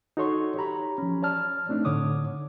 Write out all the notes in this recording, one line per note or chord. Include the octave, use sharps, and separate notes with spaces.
D#4 F#4 A4 C#5 C6 C#6
G4 C#5 A#5 B5
F3 C#4
C#5 D5 A5 F6
A3 C4 D4 D#4
A2 D3 C#5 D6 D#6